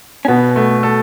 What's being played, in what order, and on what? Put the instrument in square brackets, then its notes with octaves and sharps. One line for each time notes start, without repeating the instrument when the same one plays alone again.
[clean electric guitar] C#4
[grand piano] B2 [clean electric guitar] B3
[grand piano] A3
A4